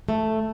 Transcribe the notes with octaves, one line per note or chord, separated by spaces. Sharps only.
A3